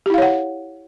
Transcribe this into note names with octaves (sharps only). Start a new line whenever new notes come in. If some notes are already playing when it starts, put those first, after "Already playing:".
E4 G4 C#5 F5 F#5